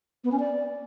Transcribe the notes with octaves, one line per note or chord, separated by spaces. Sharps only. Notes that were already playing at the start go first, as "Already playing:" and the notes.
B3
C#4
D5